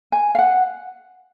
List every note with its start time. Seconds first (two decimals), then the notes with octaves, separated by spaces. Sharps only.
0.12 G#5
0.35 F5
0.39 F#5